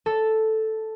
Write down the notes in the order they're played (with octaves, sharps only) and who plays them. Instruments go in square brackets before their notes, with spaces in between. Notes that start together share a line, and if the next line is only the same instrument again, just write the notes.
[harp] A4